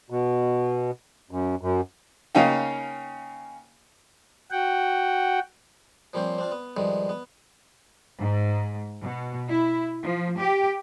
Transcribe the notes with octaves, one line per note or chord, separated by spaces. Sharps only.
B2
F#2
F#2
C#3 A#3 C#4 D#4 F5 G5
F#4 F#5 G5
F3 G3 A#3 C4 C#4 C5
C4 D4 F4
B3
G2 D#3 F3 G3 G#3
B3
G#2
B2
E4
F3
G4